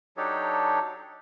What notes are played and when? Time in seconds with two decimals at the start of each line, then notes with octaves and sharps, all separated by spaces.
0.17 F#3 D4 D#4 G4 A4 C#5